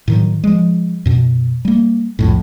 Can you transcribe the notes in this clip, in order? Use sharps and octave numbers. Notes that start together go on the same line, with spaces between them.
A2 D#3 F#3
F3 G#3
F#2 B2
G3 A#3
C2 F2 A2